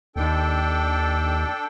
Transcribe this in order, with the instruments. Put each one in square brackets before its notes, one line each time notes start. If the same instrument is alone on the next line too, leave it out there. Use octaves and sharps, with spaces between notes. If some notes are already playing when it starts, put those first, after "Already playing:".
[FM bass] D#2 [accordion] D4 A4 G5